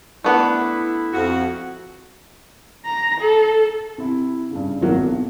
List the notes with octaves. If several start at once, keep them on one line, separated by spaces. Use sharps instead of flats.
A3 B3 D4 E4
F2 F#4
A#5
A4
C3 E4
G2 C#3
G#1 F#3 A#3
B1